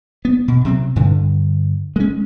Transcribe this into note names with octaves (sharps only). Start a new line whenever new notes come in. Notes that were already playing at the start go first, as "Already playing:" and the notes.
B3
B2
C3 F#3 C4
G2 D3
G#3 C#4